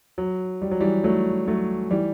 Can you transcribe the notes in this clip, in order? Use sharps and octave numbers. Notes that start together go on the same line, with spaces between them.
F#3
G3
F#3
E3 G3
F#3 A3
F#3 A3
E3 G3